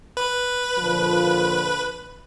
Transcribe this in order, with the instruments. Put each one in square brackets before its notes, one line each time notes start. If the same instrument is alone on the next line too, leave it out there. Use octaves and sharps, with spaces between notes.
[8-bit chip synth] B4
[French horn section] A#2 D3 F3